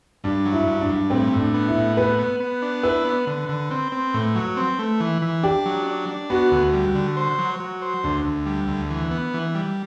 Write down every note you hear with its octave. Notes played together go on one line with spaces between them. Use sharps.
G2 D4
F#3
E4
G2
D4
G2
A2 C4
A2
D4
B3
E4
A2
B3 B4
B3
B3
D4
E4 B4
B3
D3
D3
C4
C4
A2
F#3
C4
A3
E3
E3
D4 G4
F#3
D4
D4
B3 F#4
D2
G3
D3
C5
F#3
F#3
C5
D2 D4
D2
G3
D2
E3
B3
E3
G3